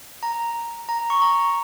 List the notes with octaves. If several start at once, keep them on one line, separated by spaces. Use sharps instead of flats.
A#5
A#5
C#6
A#5